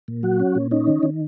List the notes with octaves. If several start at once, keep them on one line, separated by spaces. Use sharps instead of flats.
A#2
F#3 F#4
C#4
A#2
C#4 D#4
D#3
D#3